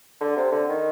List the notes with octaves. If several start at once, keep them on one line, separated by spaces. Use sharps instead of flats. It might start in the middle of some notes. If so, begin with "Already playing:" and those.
D3
C3
D3
D#3